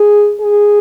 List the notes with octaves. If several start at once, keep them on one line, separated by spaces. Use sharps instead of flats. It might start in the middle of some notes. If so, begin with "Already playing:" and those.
Already playing: G#4
G#4